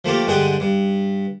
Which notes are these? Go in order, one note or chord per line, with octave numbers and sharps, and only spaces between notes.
F3 A3 A#3 G4
G2 D3 G#3 G#4 F#5 G5
G2